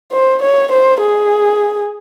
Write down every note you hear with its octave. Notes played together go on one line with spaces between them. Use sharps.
C5
C#5
C5
G#4